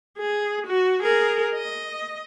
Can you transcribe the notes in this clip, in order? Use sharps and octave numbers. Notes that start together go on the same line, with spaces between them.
G#4
F#4
G#4 A#4
D#5